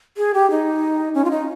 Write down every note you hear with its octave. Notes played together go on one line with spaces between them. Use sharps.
G#4
G4
D#4
C#4
F4
D#4